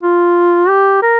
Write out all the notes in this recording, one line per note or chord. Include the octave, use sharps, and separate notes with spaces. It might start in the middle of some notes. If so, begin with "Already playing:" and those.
F4
G4
A#4